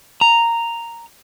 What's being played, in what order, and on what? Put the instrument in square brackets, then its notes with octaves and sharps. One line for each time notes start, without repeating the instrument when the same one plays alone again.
[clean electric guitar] A#5